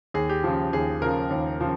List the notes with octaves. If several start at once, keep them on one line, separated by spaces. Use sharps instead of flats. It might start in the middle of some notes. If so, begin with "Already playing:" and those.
D#2 G#4
G4
C#3 F3
D#2 G#4
C#3 F3 A#4
D#2
C#3 F3